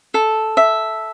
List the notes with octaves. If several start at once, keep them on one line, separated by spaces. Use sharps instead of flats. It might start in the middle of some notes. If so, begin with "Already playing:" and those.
A4
E5